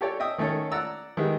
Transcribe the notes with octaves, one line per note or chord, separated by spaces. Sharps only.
G4 A4 C#5 D5 G5
D#5 E5 G5 D#6
D#3 A3 C#4 A4 C#5
D5 F#5 A#5 E6
D#3 G3 G#3 B3 D#4 E4